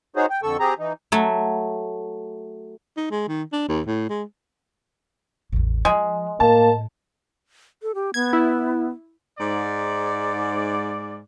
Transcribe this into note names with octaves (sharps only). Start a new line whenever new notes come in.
D#4 F#4 G#4 C5 C#5
G5
F2 D3 A4 C#6 E6
C4 G4 G#4 A#5
E3 D#4
F#3 A3
D#4
G#3
D#3
D4
D#2
A2
G#3
A1 E2
F3 G#3
A2 A#3 A5
A4
G4
B3 G#6
E4
G#2 D5